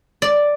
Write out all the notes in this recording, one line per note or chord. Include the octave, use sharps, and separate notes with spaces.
D5